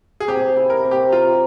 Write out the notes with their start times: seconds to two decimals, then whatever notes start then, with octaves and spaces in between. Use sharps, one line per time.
0.20 G#4
0.28 C3 G4
0.57 E4
0.70 A#4
0.85 C3
0.91 G4
1.12 F4 A#4